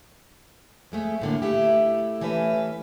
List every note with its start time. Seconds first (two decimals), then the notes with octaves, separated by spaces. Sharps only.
0.92 F2 G#3 A3
1.22 A2 D3 A#3
1.42 A3 E4 G4
2.21 E3 A3 C#4 B4